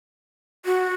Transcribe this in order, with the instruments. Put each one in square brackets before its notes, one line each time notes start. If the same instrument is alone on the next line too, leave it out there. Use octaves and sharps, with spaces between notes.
[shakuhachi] F#4